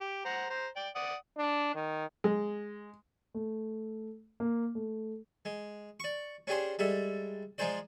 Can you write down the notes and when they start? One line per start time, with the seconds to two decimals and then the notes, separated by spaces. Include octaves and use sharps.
0.01 G4
0.25 C5 F#5 A#5
0.50 C5 A#5
0.76 D5 G5
0.96 D5 F#5 D#6
1.37 D4
1.75 D#3
2.24 G#3
3.34 A3
4.40 A#3
4.75 A3
5.45 G#3
6.00 D5 C#6
6.47 C#4 D4 G4 G#4 C5
6.79 G3 G#3 A4 E5
7.58 F3 G#3 D#4 G#4 C5 D5